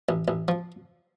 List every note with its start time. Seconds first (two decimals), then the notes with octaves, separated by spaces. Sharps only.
0.09 A1
0.28 A1
0.48 F3